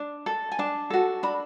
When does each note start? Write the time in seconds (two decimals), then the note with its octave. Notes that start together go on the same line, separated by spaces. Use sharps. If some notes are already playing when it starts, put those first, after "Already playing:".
Already playing: D4
0.26 A4
0.52 G#5
0.59 D4 A5
0.90 F#4 A4
1.23 D4 B5